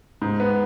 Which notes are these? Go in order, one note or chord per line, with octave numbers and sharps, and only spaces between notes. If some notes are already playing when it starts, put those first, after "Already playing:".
G#2
B3